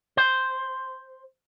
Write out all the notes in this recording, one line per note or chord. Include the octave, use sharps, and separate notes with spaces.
C5